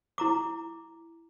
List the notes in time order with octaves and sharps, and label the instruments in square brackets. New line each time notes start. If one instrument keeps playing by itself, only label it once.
[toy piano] E4 A#5 D6